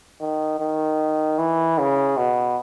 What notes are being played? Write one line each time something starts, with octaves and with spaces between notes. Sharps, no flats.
D#3
D#3
E3
C#3
B2